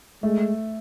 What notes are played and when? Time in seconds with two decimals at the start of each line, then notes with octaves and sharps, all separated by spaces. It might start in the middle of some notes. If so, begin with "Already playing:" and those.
0.23 G#3 A3